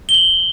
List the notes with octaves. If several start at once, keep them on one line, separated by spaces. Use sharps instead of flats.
G7
F#7